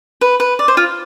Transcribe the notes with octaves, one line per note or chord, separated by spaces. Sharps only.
B4
B4
D5
C5
F4